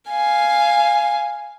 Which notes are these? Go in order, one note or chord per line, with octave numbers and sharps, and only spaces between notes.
F5 G#5